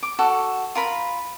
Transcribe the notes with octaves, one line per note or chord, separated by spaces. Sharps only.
D6
F#4 A4
F4 A#4 B5